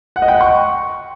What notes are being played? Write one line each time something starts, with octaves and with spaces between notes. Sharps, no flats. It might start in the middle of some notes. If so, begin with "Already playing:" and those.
F#5
D#5
G5
F#5
C#6